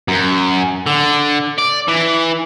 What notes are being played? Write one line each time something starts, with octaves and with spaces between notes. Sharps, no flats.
F#2
D3
D5
E3